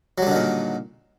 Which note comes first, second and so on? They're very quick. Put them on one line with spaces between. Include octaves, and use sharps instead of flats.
F#3 G3 D3 D#3 A#2